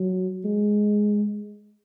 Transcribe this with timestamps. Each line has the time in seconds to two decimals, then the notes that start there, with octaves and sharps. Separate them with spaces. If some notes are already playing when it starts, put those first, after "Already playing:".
Already playing: F#3
0.45 G#3